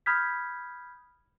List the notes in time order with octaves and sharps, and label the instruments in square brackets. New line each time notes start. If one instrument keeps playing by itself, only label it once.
[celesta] B5 D#6 F6 G6 G#6 B6